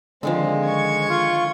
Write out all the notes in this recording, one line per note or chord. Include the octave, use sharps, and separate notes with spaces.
D3 D#3 F3 G#3 C4
C#6 G#6
F4